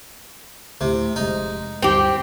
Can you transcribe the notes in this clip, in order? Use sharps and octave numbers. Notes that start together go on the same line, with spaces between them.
D2 A2 C3
F1 G#3 D#4
D2 G2 C4 G4